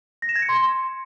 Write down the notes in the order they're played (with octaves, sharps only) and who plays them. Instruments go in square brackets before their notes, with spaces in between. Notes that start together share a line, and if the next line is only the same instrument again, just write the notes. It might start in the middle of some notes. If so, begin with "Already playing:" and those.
[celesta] A#6
E7
G#6
C#7
C6